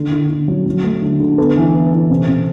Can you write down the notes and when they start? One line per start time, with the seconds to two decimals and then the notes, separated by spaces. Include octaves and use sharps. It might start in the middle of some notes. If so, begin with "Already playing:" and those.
Already playing: D3
0.12 D3
0.30 D3
0.48 F#3
0.66 F#3
0.84 A3
1.02 D3
1.20 D3
1.38 B3 A4
1.56 E3
1.74 B3
1.92 E3
2.10 C3
2.28 C3